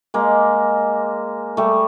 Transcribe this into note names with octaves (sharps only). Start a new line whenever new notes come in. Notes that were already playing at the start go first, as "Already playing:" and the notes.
G#3 A#3
G3 A3